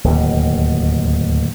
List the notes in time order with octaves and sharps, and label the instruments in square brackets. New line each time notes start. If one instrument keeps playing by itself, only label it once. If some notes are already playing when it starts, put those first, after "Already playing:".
[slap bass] D1 D#2 B2